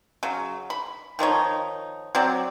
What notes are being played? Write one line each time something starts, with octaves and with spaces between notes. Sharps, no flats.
C#3 F#3
B5
D#3 F3 D#4 C#5
F#3 C4 D5